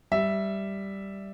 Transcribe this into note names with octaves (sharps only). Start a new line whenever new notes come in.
G3 E5